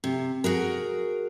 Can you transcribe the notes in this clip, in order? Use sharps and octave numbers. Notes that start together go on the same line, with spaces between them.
C3
F#4 G#4 A#4